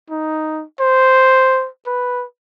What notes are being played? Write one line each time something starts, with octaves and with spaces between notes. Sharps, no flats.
D#4
C5
B4